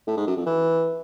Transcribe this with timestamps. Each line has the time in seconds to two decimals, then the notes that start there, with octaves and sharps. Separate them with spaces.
0.07 A2
0.17 G#2
0.27 F#2
0.36 F2
0.46 E3